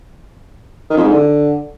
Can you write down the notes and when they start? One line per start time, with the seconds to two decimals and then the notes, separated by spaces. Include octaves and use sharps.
0.90 D#3
0.97 F2
1.04 G#2
1.11 D3